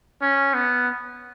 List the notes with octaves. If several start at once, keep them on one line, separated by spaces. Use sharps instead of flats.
C#4
B3